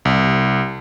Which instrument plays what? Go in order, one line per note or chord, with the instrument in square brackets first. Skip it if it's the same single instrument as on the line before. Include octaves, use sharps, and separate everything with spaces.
[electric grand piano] C2